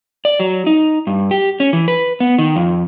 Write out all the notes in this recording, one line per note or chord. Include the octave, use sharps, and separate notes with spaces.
D5
F#3
D#4
G2
G4
C#4
E3
B4
B3
D#3
F2